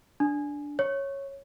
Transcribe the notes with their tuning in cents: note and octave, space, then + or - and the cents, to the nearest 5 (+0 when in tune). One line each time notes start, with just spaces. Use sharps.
D4 -5
C#5 -10